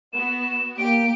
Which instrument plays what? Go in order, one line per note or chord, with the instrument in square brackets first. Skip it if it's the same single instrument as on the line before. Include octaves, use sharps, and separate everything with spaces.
[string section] B3 F#4 [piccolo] E7
[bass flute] A#3 [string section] G4 [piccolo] D7